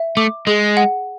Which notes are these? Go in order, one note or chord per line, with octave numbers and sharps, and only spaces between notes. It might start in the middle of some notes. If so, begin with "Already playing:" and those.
Already playing: E5
A3 D6
G#3 G#4
F#5